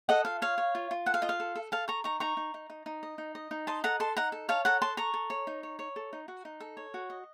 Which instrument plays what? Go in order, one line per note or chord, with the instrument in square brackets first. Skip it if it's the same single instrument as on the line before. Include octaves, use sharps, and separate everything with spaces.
[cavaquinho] A4 D#5 F#5
F4 F5
C#5 F5
C#5
F4
F4
A4 F#5
F5
F4 D#5
F5
A4
A4
A4 F5 A5
A4 A#5 C#6
D#4 A#5 C#6
D#4 A#5 C#6
D#4
D#4
D#4
D#4
D#5
D#4
D#5
D#4
D#5 A5 C6
A4 F#5 A#5
A4 A5 C6
D#4 F#5 A#5
A4
C#5 F5 A5
A4 F#5 A#5
A4 A5 C6
A4 A#5 C#6
A4
C#5
D#4
C#5
C#5
A4
D#4
F#4
D#4
A4
C#5
F#4
D#5